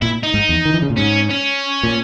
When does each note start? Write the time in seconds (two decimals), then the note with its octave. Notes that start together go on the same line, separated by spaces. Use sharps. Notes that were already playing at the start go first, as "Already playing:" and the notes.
0.02 A#2 E4
0.23 D#4
0.34 G#2
0.49 E2
0.65 D#3
0.74 E3
0.82 C#3
0.90 A#2
0.97 G#2 C#4
1.31 C#4
1.83 A#2